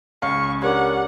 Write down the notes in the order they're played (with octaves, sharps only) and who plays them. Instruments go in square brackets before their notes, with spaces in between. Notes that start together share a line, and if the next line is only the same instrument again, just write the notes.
[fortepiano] C#2 F5 [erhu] C#6
[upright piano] D4 A#4 C#5 [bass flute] G4 [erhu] F#5